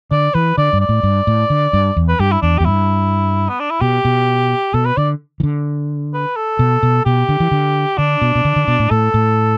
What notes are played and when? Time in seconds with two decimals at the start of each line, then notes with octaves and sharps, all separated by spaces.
0.11 D3 D5
0.34 E3 B4
0.58 D3 D5
0.73 G2
0.80 D5
0.89 A2
1.03 G2
1.27 A2
1.50 D3
1.73 G2
1.97 E2
2.08 B4
2.20 G2 G4
2.32 E4
2.42 E2 D4
2.58 E2 G4
2.65 G2 E4
3.49 B3
3.60 D4
3.71 E4
3.81 B2 G4
4.05 B2
4.74 B2 A4
4.86 B4
4.97 D3 D5
5.40 E3
5.43 D3
6.14 B4
6.36 A4
6.59 B2
6.83 B2
7.05 B2 G4
7.29 D3
7.40 E3
7.51 D3
7.98 D3 D4
8.22 B2
8.35 B2
8.45 D3
8.56 D3
8.68 B2
8.79 A2
8.91 A2 A4
9.14 A2